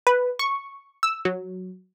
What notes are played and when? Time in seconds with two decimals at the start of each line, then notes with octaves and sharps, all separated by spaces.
0.07 B4
0.39 C#6
1.03 E6
1.25 F#3